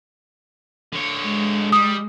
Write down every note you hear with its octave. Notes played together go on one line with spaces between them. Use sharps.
D3 C#5
G#3
G3 D#6